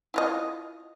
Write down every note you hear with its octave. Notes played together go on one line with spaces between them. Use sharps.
E4 F4 D#5